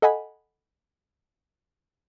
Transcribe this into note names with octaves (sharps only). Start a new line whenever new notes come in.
A4 D#5 F#5 G#5 B5